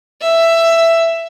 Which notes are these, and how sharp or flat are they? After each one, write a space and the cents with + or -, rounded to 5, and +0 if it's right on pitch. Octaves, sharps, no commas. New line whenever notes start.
E5 +10